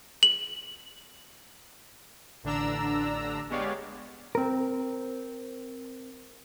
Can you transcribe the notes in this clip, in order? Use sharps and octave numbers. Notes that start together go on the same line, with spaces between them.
F#7
A1 D3 D4 A#5 E6
G#3 B3 G4 C#5 D5 F5
C4 A#4